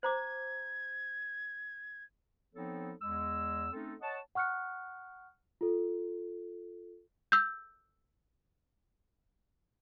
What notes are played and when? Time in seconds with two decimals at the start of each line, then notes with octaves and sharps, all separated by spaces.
0.03 C5 A#5 D6 G#6
2.55 F3 B3 C4 D#4 A4 C#5
3.00 E2 G#3 E6
3.72 A3 C4 C#4 D#4 A4
4.01 C#5 D#5 F#5 A5
4.35 F#5 C#6 F6 F#6 C#7
5.61 F4 A4
7.32 E6 G6